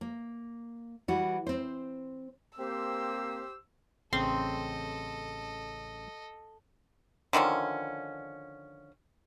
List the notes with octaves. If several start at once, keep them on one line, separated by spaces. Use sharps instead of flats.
A#3
E3 G3 F#4
C4 C5
A#3 C4 G4 C5 E6
A1 C#3 C4 A4 D#5 C6
D3 D#3 F3 C#4